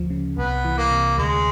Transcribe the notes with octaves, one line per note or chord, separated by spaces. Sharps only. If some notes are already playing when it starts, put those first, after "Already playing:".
Already playing: D2 F3
C#3
C2 B3
E3
A#3
C3
D2 G#3